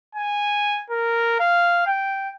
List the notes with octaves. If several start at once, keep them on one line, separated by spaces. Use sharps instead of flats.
G#5
A#4
F5
G5